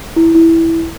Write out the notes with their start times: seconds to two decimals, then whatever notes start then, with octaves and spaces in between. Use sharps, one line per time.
0.16 E4
0.34 E4